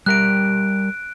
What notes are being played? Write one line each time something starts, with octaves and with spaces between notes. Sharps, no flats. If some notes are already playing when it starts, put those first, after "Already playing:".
G3 G4 A#4 F#6 D7